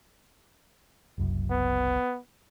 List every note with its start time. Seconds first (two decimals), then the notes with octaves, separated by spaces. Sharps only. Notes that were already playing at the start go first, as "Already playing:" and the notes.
1.18 F#1 C2 F#2
1.50 B3